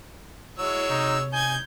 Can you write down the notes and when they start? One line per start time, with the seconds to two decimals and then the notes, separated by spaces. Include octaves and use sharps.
0.58 F#3 G#3 E4 C#5 E6
0.89 C3 D#4
1.33 D#4 G#5 G6 G#6